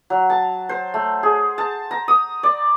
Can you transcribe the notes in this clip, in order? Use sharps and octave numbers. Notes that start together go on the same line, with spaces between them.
F#3
A5
C5
A3
G#4
A5
A#5
D#6
D5